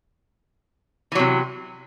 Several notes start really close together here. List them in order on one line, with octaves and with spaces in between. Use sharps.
E3 F#3 C3